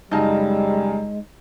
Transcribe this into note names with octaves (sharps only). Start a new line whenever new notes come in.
F#2 C#3 G3 G#3 D#4 D#5 A5